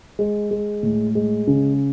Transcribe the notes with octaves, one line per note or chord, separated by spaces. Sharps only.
G#3
G#3
A2
G#3
C#3